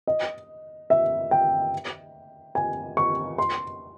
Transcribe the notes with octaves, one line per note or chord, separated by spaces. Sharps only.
D#5
E5
G5
G#5
C#6
C6